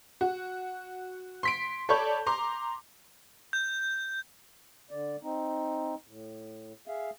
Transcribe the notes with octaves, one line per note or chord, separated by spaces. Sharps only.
F#4
C6 B6 D7
A4 C#5 D5 B5 C#6 G6
A#5 C6 D6
G6
D3 D5
C4 D#4
A2
G#4 E5 F5